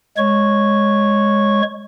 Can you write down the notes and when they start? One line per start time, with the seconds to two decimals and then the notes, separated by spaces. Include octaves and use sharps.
0.18 G#3 C#5 C#6